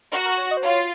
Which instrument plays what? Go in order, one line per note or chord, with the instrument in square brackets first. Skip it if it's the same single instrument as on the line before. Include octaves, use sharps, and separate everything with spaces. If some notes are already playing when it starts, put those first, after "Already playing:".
[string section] F#4 [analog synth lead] A#4
[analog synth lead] A#4
C#5
D#5
C5
[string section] F4 [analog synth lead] C#5